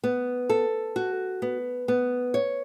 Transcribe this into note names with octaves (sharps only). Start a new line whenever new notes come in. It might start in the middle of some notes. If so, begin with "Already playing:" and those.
B3
A4
F#4
B3
B3
C#5